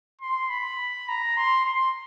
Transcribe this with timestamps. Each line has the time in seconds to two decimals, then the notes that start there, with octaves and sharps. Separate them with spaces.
0.21 C6
0.50 B5
1.09 A#5
1.37 C6
1.65 C6